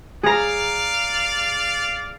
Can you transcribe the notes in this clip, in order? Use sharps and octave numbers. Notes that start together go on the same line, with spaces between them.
G#4 D5 F5 A#5